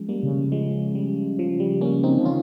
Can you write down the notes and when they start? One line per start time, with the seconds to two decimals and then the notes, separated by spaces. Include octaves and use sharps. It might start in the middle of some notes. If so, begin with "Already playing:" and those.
Already playing: F3 G#3 C#4
0.09 G3 A#3
0.23 C#3
0.52 F3 G#3
0.95 G3
1.39 F3
1.60 G3
1.81 A#3 C#4
2.03 C4 D#4
2.19 F3
2.25 D#3 C#4 F4